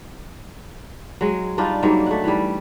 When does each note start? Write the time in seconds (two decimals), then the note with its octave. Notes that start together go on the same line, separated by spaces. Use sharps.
1.21 F#3 G#3
1.58 G3 D4 D#4 F4
1.83 G#2 F#3 G3 A#3
2.06 A3 F#5
2.24 E3 G3